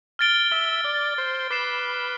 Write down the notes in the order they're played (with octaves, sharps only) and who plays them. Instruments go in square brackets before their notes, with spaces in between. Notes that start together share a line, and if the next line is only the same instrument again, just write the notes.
[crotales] F6 A6 D7 G7
[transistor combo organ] E5
D5
C5
[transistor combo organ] B4 [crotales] D6 A6 C7 E7